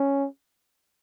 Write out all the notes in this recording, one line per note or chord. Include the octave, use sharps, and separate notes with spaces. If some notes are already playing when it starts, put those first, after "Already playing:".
Already playing: C#4